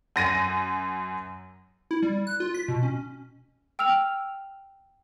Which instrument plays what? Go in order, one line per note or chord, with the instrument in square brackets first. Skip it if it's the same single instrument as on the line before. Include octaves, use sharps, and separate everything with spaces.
[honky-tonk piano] F#2 A#6 D#7
[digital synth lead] E4
G3
F#6
F4
B6
B2
C#4
[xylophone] G5 E6 F6 F7